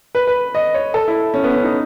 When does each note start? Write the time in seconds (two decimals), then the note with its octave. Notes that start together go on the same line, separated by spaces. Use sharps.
0.15 B4
0.27 B4
0.55 D#5
0.74 C#5
0.94 A4
1.08 E4
1.34 C#4
1.44 B3
1.54 C#4
1.64 D#4